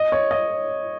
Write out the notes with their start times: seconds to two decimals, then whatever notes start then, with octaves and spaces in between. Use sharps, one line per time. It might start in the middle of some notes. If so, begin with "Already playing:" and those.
Already playing: D#5
0.12 C#5
0.31 D#5